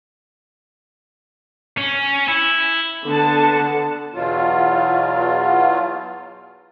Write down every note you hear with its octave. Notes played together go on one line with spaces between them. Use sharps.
C#4
E4
D3 B3 F#5 A5
E2 B2 F#3 F4